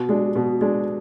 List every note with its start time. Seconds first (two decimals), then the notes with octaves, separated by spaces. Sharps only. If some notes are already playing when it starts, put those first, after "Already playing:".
Already playing: B2
0.09 G#3 D4
0.35 B2
0.61 G#3 D4